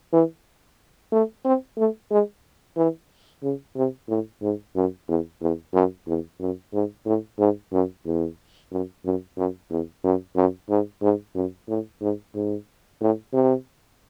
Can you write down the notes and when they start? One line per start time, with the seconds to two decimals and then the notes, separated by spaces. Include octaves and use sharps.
0.13 E3
1.12 A3
1.45 C4
1.77 A3
2.11 G#3
2.77 E3
3.43 C#3
3.76 C3
4.09 A2
4.42 G#2
4.75 F#2
5.08 E2
5.41 E2
5.74 F#2
6.07 E2
6.40 F#2
6.73 G#2
7.05 A2
7.39 G#2
7.72 F#2
8.05 E2
8.71 F#2
9.05 F#2
9.37 F#2
9.70 E2
10.04 F#2
10.36 F#2
10.69 G#2
11.02 G#2
11.35 F#2
11.69 A2
12.01 G#2
12.35 G#2
13.01 A2
13.33 C3